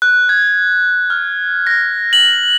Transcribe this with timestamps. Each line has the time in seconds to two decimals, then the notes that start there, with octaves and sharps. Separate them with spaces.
0.02 F#6
0.29 G#6
1.10 F6
1.67 A#6
2.13 F#7